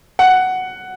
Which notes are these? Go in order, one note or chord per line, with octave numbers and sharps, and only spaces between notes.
F#5